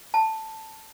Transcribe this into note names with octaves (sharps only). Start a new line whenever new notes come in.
A5